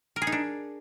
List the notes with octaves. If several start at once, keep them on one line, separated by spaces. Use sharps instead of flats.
A#4
G#4
D#4
D4